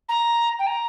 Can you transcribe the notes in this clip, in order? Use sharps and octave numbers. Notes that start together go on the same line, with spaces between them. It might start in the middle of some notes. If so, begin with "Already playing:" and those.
A#5
G5
A#5